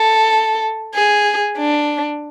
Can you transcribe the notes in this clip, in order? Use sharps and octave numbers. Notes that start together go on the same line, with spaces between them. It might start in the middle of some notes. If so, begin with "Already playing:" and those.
Already playing: A4
G#4
D4